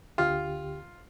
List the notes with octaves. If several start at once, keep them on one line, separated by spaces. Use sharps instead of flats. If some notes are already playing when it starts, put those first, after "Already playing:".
D2 D3 F4 G4